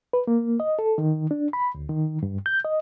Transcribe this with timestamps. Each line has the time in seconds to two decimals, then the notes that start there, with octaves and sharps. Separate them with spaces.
0.13 B4
0.27 A#3
0.60 D#5
0.79 A4
0.98 D#3
1.31 D4
1.53 B5
1.75 D2
1.90 D#3
2.23 G2
2.46 G6
2.65 D#5